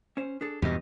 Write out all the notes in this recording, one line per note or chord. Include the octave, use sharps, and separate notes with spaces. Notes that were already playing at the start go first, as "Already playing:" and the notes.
C#4 C5
D4 G#4 A4
E2 G2 B2 G4 B4 D#5